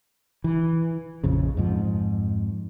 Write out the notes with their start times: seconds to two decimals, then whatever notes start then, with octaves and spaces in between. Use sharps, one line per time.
0.44 E3
1.24 A#1 F2 C#3
1.57 F2 G#2 F3